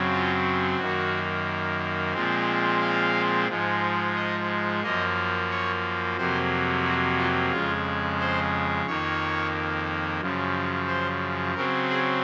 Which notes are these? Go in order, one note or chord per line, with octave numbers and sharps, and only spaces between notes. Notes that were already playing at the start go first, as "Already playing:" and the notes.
Already playing: F#2 C#3 F#3 C4
F4
F#2 D#3 A#3 F#4
A#2 F3 G#3 C4
F5
G#2 F3 G#3
D#5
F#2 F3 A#3 D#5
C#5
F2 C3 F#3 A#3 C5
F#4
F4
F2 C#3 G#3 F4
C5
F2 D#3 A#3 C#5
F#2 C#3 F3
C5
C#3 F#3 C4 A#4
G#4